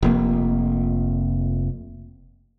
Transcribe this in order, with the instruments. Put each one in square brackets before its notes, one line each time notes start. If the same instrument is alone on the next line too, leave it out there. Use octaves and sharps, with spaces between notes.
[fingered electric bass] F1 F2 A#3